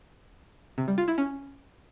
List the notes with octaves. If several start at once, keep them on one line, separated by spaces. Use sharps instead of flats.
C3
G3
F4
E4
C#4